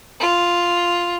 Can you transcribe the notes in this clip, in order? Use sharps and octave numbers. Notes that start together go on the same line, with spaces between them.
F4